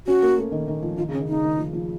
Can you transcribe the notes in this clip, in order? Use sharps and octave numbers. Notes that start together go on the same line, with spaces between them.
C#4 F#4
A#3
A3
D#3
D#3
F3
D#3 F4
C#3
C#4
D#3
C#3 D#4
D#3
F3
F3